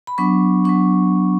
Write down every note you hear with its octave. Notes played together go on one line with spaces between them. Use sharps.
B5
F#3 B3 D4 C#6
F#3 B3 D4 C#6